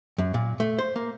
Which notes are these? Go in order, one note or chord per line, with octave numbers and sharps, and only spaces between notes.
F#2
A#2
A3
C5
A#3